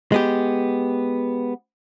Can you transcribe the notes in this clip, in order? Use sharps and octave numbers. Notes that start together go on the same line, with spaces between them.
G#3 B3 G4